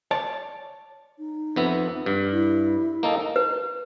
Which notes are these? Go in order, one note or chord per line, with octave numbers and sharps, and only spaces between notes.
C#5 D5 A5
D#4
F2 B3 E5
G2
E4
A#3 D#4 A4
B4